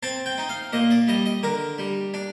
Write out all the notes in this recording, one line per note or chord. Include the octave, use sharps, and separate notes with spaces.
C4 A5
G5
D#4
F5
A#2 D#5
D5
G3 D#5
D#5
D3 A#4
G3
D4